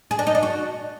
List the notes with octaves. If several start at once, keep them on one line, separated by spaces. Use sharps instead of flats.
G#4
D4
D#4
D4
F#4